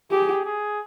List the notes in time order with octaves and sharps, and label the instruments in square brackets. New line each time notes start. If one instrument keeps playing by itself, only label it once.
[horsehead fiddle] G4 [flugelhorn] G#4
[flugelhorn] G#4